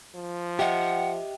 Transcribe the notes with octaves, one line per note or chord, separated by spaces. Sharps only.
F3
G4 D#5 E5 F#5 G5